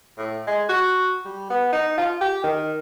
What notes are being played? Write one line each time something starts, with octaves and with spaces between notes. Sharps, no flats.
A2
G#3
F#4
G3
B3
D#4
F4
G4
D#3